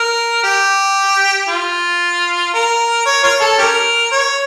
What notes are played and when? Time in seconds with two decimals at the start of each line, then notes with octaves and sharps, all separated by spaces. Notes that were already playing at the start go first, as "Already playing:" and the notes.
Already playing: A#4
0.44 G4
1.48 F4
2.54 A#4
3.06 C#5
3.23 F4 A#4 C#5
3.41 A4
3.58 C#4 G4 A#4
4.11 C#5